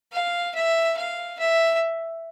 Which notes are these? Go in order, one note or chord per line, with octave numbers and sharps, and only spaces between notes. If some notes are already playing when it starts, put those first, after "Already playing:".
F5
E5
F5
E5